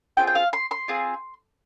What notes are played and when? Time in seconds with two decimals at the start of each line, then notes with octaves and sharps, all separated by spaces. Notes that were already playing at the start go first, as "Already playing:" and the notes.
0.17 C4 F4 G#4 G5
0.27 G5
0.35 F5
0.53 C6
0.71 C6
0.88 C4 F4 G#4